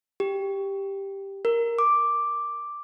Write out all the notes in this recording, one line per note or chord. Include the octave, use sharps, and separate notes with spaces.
G4
A#4
D6